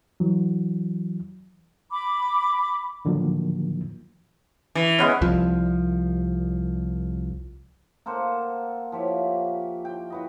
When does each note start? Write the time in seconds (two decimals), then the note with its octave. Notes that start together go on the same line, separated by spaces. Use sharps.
0.20 E3 F#3
1.91 B5 D6
3.05 A2 D3 D#3 F3 F#3 A#3
4.75 E3
4.99 G#3 B3 C#4
5.22 C2 F3
8.06 A#3 A4 C5 F#5
8.92 F3 G4 C#5 E5
9.85 G5
10.10 F#4 B4 D#5